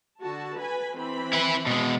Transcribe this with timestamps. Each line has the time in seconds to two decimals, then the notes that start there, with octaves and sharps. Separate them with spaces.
0.21 D3 F#4 A5
0.59 B4 G#5 B5
0.97 E3 C4 B5
1.33 E4 B4
1.66 B2 G#3